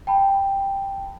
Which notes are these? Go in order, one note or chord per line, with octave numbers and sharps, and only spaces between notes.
G5 A5 B5